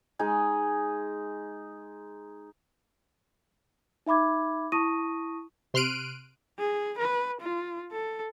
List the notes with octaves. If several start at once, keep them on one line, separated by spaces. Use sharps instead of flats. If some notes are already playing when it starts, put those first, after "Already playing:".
G#3 D#4 G#4
D#4 E5 B5 D6 G#6
E4 A5 C#6 D#6 A#6 D#7
C3 C6 F6 F#6 D7 D#7
G#4
B4
F4
A4